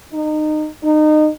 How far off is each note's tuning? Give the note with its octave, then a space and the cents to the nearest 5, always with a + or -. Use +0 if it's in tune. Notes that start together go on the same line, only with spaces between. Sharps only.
D#4 -25
D#4 -25